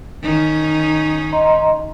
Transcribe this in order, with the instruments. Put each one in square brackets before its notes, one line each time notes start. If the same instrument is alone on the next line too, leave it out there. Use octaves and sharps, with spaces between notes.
[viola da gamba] D#3 C#4 D#4
[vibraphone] D#5 A#5 C6